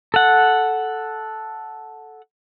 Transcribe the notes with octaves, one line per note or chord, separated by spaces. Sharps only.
A4 F#5